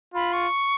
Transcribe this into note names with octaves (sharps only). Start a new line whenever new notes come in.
F4 B5
C#6